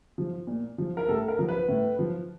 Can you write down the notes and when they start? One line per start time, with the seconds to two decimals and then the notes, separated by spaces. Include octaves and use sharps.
0.18 F3
0.47 A#2
0.78 F3
0.97 A#4
1.08 A2 A4
1.28 A#4
1.39 F3
1.48 B4
1.69 A2
1.99 F3